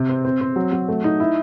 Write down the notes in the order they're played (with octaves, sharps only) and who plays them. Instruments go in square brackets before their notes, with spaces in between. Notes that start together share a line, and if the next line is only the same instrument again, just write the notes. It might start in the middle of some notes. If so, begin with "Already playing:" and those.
Already playing: [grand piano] C3
C4
C4
C4
F#3
F#3
A3
D#4
E4